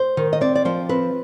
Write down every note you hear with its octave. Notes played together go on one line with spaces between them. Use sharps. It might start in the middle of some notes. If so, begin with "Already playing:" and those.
Already playing: C5
D#3
D#5
C4 D5
D5
F3 C5
C4 B4